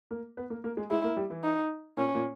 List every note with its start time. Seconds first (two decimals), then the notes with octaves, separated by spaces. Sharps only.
0.11 A#3 A#4
0.37 B3 B4
0.50 A#3 A#4
0.64 A#3 A#4
0.77 G#3 G#4
0.90 G#3 E4 G#4
1.04 A#3 A#4
1.17 G3 G4
1.30 E3 E4
1.44 D#4
1.97 A#2 A#3 C#4
2.15 A#2 A#3